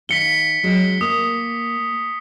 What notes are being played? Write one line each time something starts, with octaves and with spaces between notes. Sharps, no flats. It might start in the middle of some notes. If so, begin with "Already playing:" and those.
D#3 F5 B6 C#7 G7
F#3 G#3 C#4
A#3 D#6